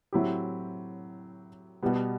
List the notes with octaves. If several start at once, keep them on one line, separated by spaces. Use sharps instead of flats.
A2 F#3 C4 E4 G4
B2 G3 B3